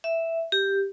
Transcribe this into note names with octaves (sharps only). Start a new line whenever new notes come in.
E5
G4